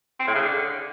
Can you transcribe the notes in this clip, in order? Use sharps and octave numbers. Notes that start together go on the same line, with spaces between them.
C4
A2
C#3
D3